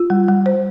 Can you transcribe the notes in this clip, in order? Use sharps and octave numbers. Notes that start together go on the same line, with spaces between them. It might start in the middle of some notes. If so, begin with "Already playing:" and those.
Already playing: F4
G3
G3
C5